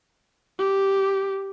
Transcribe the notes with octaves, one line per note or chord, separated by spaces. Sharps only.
G4